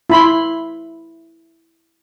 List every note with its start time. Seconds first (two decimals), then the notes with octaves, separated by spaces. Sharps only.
0.10 E4 B5 C6